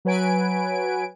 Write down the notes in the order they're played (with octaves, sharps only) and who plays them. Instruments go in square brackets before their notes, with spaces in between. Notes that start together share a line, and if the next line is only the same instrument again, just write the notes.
[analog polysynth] F#3 B4 G#5 D7